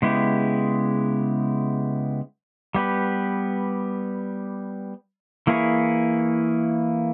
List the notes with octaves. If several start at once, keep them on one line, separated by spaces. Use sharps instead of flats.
C#3 G#3 B3 E4 G4
G3 B3 G4 B4
E3 A#3 E4 G#4 C#5